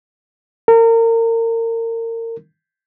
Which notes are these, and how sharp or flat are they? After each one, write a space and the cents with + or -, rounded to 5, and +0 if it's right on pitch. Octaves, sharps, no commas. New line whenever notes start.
A#4 -30